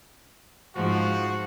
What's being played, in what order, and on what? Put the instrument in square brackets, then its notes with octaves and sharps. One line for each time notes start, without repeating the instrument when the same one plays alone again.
[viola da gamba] G#2 F3 [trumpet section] F#4